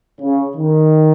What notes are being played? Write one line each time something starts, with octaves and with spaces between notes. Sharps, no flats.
C#3
D#3